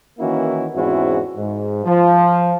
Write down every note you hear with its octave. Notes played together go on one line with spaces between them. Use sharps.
D#3 E3 A#3 C#4 E4 F#4
E2 G#2 C4 C#4 E4 F#4
G#2
F3